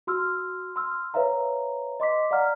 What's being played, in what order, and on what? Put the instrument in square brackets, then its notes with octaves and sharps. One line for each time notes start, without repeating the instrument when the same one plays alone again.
[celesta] F#4 C6 E6 F6
C6 E6 F6
B4 C#5 E5 F5 A#5
D#5 C6 D6 B6
D5 F5 F#5 A#5 F6